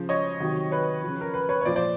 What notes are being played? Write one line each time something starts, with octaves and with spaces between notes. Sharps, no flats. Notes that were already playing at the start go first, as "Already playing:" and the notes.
Already playing: C#3 F3 C5
C#5 D#5
C3 D#3 F#3
B4 C#5
F3
C#3
A#4
B4
B4 C#5
C#5
A#2 F3 C5 D5
C5 D5